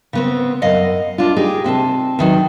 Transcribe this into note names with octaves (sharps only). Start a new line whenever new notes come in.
C#3 B3 C4
F#2 D#5 F5 F#5
D4 F4
D#4 G4 G#4
C3 C4 B4 A5
E2 D#3 F#3